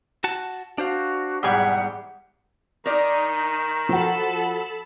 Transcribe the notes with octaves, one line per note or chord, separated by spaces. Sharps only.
F#4 F#5 A5
D4 F#4 C5 F5
B1 E2 G#2 G3 G#4 F#5 G#5
D#3 D#4 A#4 D5
F3 F#4 A4 A5 B5